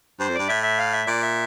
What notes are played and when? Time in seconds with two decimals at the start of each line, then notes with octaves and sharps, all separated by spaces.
0.19 G2 C5
0.29 F2
0.34 G2 D5
0.48 A2 E5
0.63 E5
0.78 F5
0.93 E5
1.06 A#2 D5
1.22 E5